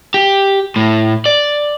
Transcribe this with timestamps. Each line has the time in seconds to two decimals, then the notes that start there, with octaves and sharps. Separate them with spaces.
0.14 G4
0.76 A2
1.26 D5